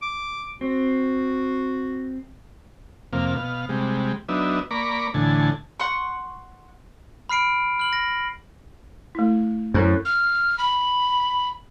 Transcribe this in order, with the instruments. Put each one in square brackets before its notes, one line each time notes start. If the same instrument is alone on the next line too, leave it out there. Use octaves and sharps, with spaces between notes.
[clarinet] D6
[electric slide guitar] C4 [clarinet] F#4
[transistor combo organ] F2 C3 A#3 F5
B2 F5
C3 G3 G#3
F#3 B3 D4 D#4 E5
A#3 D5 A#5 B5 C#6 D6
D2 A2 D3 E3 G#5 A5
[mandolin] F#5 C6 C#6
[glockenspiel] B5 F6 C7 D7
F6 F#7
A#6
[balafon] A3 E4
[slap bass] F#2 [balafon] E4 A4 C5
[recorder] F6
B5